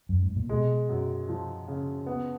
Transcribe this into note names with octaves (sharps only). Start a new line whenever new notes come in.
F#2
G#2
A#2
B2 G#3
F#2
F3
C#3
B3